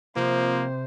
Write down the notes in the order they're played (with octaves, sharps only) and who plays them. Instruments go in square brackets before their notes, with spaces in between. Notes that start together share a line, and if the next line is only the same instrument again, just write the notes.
[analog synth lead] C3 [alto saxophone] F3 [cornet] A#3 [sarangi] C5